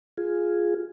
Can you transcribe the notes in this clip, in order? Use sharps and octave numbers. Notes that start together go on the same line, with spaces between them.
F4 G#4